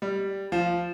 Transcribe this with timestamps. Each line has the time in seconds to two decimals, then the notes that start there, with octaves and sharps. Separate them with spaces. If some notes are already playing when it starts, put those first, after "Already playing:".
0.02 G3
0.52 F3